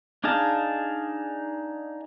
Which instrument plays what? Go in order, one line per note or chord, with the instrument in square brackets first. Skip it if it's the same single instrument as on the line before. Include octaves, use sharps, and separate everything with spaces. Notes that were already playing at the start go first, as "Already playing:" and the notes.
[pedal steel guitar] D4 D#4 G#4 F5 A5